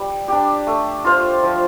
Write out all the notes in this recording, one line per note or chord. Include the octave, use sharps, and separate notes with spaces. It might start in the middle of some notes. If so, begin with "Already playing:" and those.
Already playing: G3
D4 G4
A3
F4 C5 F5
F3